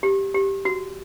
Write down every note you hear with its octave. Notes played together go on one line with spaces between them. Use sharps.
G4
G4
F#4